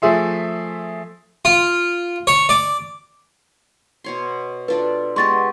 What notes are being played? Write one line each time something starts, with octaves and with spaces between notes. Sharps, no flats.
F3 A3 G#4 E5 C6
F4
C#5
D5
B2 C#5 C6
D4 F4 A4 B4
G#3 B3 G4 C6 C#6 A6